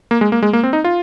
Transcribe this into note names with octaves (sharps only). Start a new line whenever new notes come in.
A#3
G#3
A#3
G#3
A#3
C4
D#4
F4